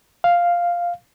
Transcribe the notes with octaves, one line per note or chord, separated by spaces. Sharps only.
F5